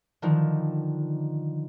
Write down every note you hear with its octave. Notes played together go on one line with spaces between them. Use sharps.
D3 D#3 F3